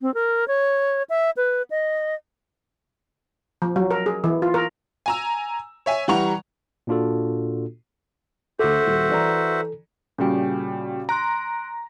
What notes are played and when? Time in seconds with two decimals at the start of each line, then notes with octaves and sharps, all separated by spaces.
0.02 C4
0.14 A#4
0.48 C#5
1.10 E5
1.37 B4
1.70 D#5
3.62 F3
3.76 F#3
3.91 A#4
4.06 G#4
4.24 E3
4.42 F4
4.54 A#4
5.06 G#5 A#5 E6
5.86 C#5 E5 G#5
6.08 E3 G3 F#5 A#5 C#6 F7
6.87 A#2 A#3 D4 F4 F#4 A4
8.59 D2 F#4 A4 C5 E5 D6
8.86 D#1
9.09 E3 D5 A#5
10.18 A#2 C#3 G3 C#4 F#4 G5
11.09 A#5 C6 F#6 D7